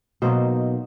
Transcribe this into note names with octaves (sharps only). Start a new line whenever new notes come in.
B2 F#3 A#3 D#4 C5